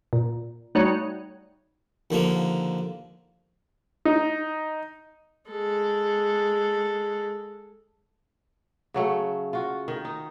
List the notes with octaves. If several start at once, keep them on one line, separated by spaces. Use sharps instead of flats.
A#2
G3 A3 D#4 F#4 C#5
D#2 D3 F3 A#3
D#4
G#3 A4
C#3 F#3 A3
F4 F#4
D#3
D#4